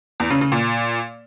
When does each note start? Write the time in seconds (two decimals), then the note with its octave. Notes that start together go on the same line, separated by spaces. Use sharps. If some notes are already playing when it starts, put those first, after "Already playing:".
0.20 E2
0.30 C#3
0.41 C#3
0.52 A#2